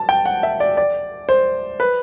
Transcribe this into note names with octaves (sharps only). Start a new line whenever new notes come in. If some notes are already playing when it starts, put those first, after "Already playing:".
Already playing: A5
G5
F#5
E5
D5
D5
C5
B4